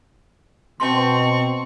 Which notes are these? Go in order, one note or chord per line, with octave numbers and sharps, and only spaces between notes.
B2 C4 A5 C6 C#6